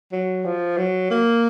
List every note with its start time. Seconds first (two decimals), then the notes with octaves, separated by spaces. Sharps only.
0.12 F#3
0.45 F3
0.78 F#3
1.11 A#3